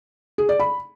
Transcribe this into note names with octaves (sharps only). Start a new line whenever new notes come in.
G#4
D5
B5